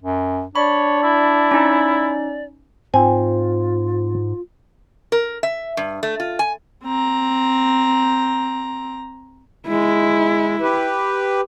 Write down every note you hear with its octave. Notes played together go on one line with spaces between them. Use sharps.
F#2
D4 C#5 D5 B5
E4
C#4 D#4
G#2 C4 F4 G#5
A#4
E5
G2
A3
F4
G#5
C4 A#5
G#3 E4
G4 B4